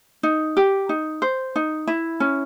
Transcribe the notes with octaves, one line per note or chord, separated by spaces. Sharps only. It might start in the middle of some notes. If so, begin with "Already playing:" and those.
D#4
G4
D#4
C5
D#4
E4
C#4